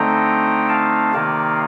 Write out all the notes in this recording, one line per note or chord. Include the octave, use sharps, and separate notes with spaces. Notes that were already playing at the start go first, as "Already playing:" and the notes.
Already playing: D3 A3 C4 D#4 G5 A#5
F5 A5
C3 D#3 A#3 D#4 D5 F5